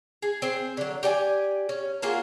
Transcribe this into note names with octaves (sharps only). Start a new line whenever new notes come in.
G#4
C4 G#4
D3 F#3
G4 D5 G5 G#5
C#4
A#3 F4 F#4 G#4